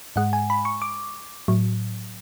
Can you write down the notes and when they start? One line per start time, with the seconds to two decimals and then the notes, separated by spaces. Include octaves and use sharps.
0.16 G#2 G#3 F#5
0.33 G#5
0.50 B5
0.65 C#6
0.82 D6
1.48 A2 F#3